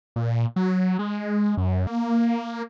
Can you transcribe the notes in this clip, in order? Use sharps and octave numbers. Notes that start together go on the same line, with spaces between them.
A#2
F#3
G#3
F#2
A#3